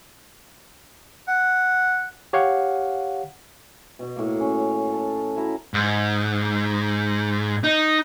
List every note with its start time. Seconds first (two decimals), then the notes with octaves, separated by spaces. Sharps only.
1.28 F#5
2.33 G4 C#5 F5 F#5
3.99 B2 D#5
4.16 A2 A#3
4.40 C#4
4.60 F5
4.93 A4
5.36 E4 F#4 E5 A#5
5.74 G#2
7.64 D#4